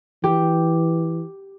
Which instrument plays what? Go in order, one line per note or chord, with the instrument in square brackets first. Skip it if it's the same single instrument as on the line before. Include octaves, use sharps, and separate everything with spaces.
[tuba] E3 [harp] G4